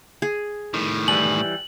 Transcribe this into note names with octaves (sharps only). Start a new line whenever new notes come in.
G#4
A2 D#3
E3 G3 G#5 F#7